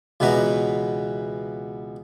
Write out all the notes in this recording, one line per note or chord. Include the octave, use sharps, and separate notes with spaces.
C#2 B2 E3 B3 B4 A#5